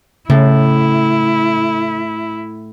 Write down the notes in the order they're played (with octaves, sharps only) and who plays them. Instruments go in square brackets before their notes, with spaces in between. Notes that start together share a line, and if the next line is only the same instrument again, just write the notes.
[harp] A2 [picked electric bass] C#3 [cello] E4